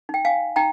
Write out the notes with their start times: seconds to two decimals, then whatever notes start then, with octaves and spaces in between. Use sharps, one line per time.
0.09 D#4 G5
0.25 F5 G#5
0.56 D#4 G5 A#5